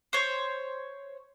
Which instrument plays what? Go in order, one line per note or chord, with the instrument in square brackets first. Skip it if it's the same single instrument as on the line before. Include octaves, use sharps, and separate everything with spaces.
[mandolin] C5 C#5